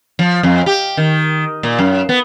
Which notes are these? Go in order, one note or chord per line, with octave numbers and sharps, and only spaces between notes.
F3
F2
G4
D#3
A#2
F#2
B3